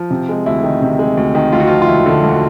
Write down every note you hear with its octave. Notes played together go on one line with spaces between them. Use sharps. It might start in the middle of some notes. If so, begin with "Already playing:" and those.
Already playing: F3
C3
G#3
D2 E4
D#3
C3
G#3
D2
D#3
D2 F4
F#4
F3 F4
F4
E1 E4
D3
D2